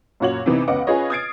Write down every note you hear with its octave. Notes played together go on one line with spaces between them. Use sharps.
F#2 A#2 F#4 C#5 F#7
C3 E3 B3 D#4
C#2 C#3 B3 D#5 F#5 D6
C#4 F4 G#4 B4 C#5 D#5
D#6 F6 G#6 A6 C7 D7